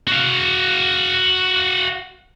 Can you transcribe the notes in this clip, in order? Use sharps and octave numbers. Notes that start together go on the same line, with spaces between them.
F#4 F5